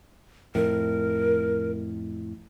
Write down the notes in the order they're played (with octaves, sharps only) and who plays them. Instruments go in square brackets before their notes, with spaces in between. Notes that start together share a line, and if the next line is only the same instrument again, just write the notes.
[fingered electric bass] F2 A2 [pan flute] A#4